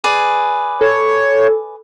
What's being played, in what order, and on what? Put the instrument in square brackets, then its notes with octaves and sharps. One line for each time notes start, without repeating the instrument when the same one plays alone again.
[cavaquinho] G#4 B4 D5
[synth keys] A4 [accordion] C#5